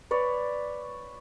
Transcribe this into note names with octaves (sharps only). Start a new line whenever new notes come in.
B4 C#5 D5